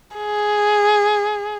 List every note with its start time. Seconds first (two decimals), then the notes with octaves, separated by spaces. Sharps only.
0.17 G#4